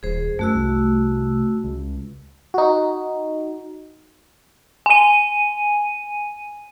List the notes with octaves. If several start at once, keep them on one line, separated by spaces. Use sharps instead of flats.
D#1 G#4 C5
F#2 A3 F#4 E6
C2
C#2
D#4 F#4
G#5 D#7